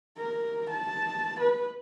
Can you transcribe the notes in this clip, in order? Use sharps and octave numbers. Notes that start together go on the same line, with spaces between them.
A#4
A5
B4